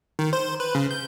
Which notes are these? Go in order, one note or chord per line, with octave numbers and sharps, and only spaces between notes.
D#3
C5
B4
C#3
G6